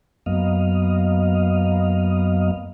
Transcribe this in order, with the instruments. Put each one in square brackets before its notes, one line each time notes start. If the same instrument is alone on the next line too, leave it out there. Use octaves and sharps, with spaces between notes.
[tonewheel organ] F#2 F#3 A#3 B3 D#5 F5